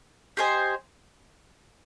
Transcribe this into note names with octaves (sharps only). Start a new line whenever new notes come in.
G4 C5 D#5 G#5